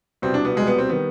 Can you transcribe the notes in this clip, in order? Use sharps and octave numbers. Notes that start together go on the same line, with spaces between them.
C2 B2 G3 C4
D4
B3
C2 B2 G3 G#3
B3
C4
D#3 G3 B3